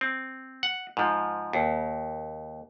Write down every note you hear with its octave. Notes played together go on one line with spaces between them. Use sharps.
C4
F#5
G#2 F3
D#2